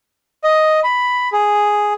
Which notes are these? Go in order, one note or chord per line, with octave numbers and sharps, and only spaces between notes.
D#5
B5
G#4